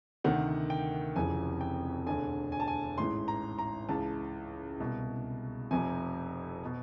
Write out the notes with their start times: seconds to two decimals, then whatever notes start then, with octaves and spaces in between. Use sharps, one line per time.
0.24 D2 C3 D#3 F#5
0.70 G5
1.16 F1 F2 C#3 E3 G#5
1.61 G5
2.06 E1 D2 D3 G#5
2.52 G#5
2.60 A5
2.68 G#5
2.98 A1 G#2 E3 C6
3.28 A#5
3.59 A#5
3.89 C#2 C#3 E3 A5
4.80 C2 B2
5.71 F1 F2 C3 G#5
6.65 B2